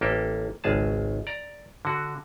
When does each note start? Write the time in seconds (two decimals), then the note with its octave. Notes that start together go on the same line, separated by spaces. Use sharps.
0.01 A1 A#3 G4 A4
0.64 G#1 C#2 G#4 A5
1.27 D5 A#5
1.85 D3 F#4